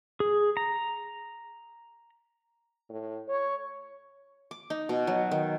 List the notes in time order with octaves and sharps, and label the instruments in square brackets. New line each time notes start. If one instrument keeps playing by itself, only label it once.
[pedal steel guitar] G#4
A#5
[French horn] A2
C#5
[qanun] D6
D#4
B2
F#3
D#3